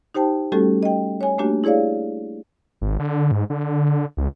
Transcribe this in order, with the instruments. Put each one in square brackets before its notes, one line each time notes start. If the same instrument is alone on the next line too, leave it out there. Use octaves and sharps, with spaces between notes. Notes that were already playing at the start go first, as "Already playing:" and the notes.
[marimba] D#4 G4 C5 G5 A5
G3 A3 C#4 F#4 G4 A4
D#5 G5
C#5 G#5
A3 A#3 D4 F#4 G4
E4 G#4 C#5 D5 F5
[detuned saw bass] G#1
D3
G#2
D3
C#2